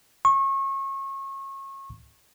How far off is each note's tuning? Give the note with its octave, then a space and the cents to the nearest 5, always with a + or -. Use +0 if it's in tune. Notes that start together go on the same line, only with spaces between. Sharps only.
C#6 -30